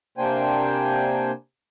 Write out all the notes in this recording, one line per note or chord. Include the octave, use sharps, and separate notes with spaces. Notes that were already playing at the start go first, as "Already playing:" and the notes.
C3 A#3 D4 C5 G5 G#5